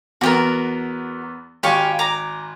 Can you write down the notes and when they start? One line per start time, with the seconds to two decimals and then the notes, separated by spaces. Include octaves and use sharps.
0.21 E2 B3 F#4 G4 A#4
1.63 G#1 G4 F5 G#5 C#6
1.99 A#5 D6